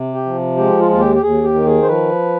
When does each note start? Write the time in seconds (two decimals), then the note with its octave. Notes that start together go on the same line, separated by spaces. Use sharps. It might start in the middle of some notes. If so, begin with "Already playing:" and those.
Already playing: C3
0.14 G4
0.25 F3
0.57 G#3 G4
0.79 F4
0.90 D#2 F4
1.00 G4
1.15 G4
1.22 D#2 G#4
1.43 G4
1.54 D#3
1.66 G#4
1.82 C5
1.87 F3 B4